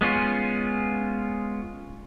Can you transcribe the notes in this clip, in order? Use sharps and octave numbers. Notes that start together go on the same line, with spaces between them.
G#3 B3 C#4 F4